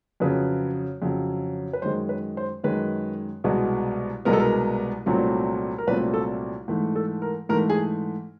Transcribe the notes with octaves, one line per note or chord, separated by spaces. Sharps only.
F2 C#3 F#3 B4
F2 C#3 F#3
B4
F#2 D#3 G#3 C5
B4
C5
F#2 D#3 G#3 B4
C2 B2 G#3 B3
C2 B2 G#3 B3 A#4
A4
A#4
C2 A#2 F#3 A3 C4
A#4
C2 A#2 F#3 A3 C4 B4
A4
G#2 E3 A3
A4
A#4
G#2 E3 A3 A#4
G#4